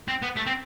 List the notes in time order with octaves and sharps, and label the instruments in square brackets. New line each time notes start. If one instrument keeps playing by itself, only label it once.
[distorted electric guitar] C4
B3
A3
C4